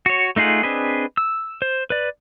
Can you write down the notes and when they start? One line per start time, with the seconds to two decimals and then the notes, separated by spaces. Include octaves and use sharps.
0.06 F#4 C#5
0.36 A3 D#4 F4 G#4 F#5
0.63 C4 D4 G#4 B4 D#5
1.17 E6
1.62 C5
1.90 B4 D5